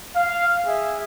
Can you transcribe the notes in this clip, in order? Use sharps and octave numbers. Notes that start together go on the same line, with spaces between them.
F5
G#4 E5